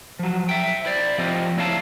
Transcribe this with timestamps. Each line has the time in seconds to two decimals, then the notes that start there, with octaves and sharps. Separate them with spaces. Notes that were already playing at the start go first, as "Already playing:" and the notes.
0.19 F3 F#3
0.49 E5 G5
0.85 E4 C5 D5
1.18 F3 C4 G4 C5 D#5
1.57 A#3 E4 C#5 F5 A5